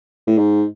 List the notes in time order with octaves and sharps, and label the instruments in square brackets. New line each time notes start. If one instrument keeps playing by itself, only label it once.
[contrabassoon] A2
G#2